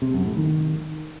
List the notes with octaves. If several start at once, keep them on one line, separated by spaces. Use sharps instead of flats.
C3
F#2
A2
D#3